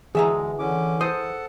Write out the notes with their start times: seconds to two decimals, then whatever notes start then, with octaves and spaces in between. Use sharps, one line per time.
0.15 D2 E3 G#3 G#4 E5 A#5
0.59 D3 C#4 D6
1.01 A4 C5 F#5 A5 D#6